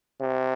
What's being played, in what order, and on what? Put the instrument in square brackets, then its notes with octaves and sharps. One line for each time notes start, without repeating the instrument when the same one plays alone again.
[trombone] C3